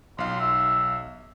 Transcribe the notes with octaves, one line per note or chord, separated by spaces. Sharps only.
B1 F4 F5
E5